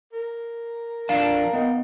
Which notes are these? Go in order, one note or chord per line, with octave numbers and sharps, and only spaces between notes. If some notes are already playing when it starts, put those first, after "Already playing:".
A#4
F2 D4 F5 A5
D#3 B3